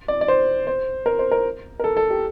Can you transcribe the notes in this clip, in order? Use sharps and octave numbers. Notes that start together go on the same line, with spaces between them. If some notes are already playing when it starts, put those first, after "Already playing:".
D5
D5
C5
C5
A#4
C5
A#4
A#4
A4
A4
G4